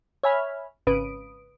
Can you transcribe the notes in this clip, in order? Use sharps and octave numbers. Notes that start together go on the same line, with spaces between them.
C#5 E5 G#5 B5 F6
G#1 C#3 B4 D#6 D7